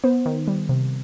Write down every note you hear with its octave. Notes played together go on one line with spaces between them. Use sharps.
B3 C5
D#3
G3
C3